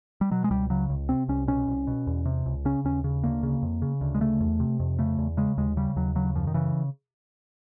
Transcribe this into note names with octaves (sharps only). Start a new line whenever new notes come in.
G3
B2 F#3
G#3
C#2 G3
C#3 F#3
C#2
C3 C4
C2 C#4
B2 C#4
C2
B2
E2
C3
C#2
C#3 C#4
D#2 C#4
C#3
D2 A#3
C#3
F2
C#3
D2
G#3
C#3 A3
E2
C3
F2
C#3 A3
E2
C#3 G#3
D#2 G#3
C#3 G3
D#2 F#3
C#3 F#3
F#2 F3
D#3
C#3 E3